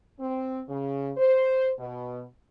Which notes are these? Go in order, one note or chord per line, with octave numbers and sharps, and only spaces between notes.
C4
C#3
C5
B2